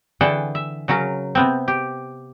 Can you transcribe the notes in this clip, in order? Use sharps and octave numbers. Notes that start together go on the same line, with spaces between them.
D3 E3 G#4 F#5 G5 A5
E5
C#3 F#3 C#4 A#4
C3 B3 C4
G4